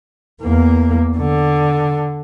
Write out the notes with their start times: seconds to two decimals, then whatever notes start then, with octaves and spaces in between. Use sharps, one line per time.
0.42 E2 A#3
1.17 D3